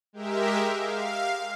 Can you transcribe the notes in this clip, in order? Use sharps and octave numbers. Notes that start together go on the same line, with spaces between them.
G#3 G4 A#4 E5
F5